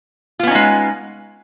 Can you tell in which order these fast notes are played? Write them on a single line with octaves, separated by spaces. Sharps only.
F4 B3 C#4 D#4 G#3